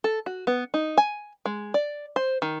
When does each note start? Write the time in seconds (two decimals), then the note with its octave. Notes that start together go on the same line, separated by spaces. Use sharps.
0.04 A4
0.26 F#4
0.47 B3
0.74 D#4
0.97 G#5
1.46 G#3
1.74 D5
2.16 C5
2.42 D#3